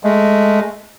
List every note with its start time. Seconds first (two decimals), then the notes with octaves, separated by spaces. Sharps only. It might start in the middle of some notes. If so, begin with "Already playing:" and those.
0.04 G#3 A3